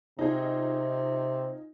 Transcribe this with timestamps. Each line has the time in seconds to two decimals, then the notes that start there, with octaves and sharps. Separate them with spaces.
0.19 C3 D#4 F4 G#4